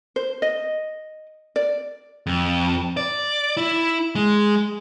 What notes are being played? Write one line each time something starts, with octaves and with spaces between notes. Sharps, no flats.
C5
D#5
D5
F2
D5
E4
G#3